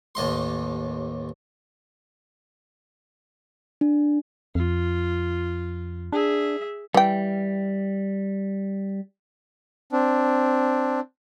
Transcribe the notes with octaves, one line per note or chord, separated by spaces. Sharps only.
A1 D#2 D#5 C6
D4
F2 F4
D4 G#4 E5
E3 G3 G5
C4 D4